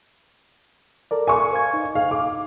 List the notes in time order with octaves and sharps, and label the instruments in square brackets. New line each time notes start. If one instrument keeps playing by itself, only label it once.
[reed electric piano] A4 A#4 D5
[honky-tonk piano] G#5 C#6
[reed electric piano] C5 F5 G#6
D#4
[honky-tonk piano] F5
D6